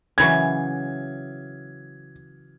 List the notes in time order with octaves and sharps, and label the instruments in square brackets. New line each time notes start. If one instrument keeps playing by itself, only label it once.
[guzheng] C#3 E3 F#3 [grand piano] G#6